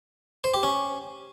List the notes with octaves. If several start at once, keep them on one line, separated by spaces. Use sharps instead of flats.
C5
G4
C#4